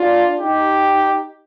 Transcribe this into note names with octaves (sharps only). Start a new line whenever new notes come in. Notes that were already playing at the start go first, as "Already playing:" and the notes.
Already playing: D4 F4
D#4 G4